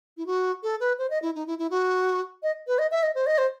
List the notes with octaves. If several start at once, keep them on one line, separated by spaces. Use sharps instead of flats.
E4
F#4
A4
B4
C5
D#5
E4
D#4
E4
E4
F#4
D#5
B4
D#5
E5
D#5
C5
D#5
C5